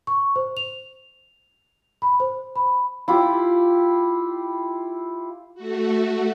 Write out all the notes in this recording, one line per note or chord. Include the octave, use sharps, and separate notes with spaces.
C#6
C5
F7
B5
C5
B5
E4 F4 G4
A3 F#4